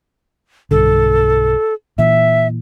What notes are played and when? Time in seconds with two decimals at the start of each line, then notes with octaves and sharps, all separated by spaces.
0.71 B1 G2 D3 A4
1.98 A#2 E3 E5